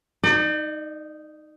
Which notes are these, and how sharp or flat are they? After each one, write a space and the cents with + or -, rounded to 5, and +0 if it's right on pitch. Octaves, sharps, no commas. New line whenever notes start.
D#4 +0 D5 +40